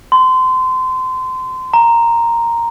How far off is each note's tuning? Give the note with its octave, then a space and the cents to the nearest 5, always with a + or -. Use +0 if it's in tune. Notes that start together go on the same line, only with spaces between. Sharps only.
C6 -30
A#5 -5